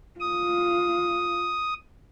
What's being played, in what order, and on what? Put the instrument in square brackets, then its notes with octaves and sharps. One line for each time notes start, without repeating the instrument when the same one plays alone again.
[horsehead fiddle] F4 [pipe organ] D#6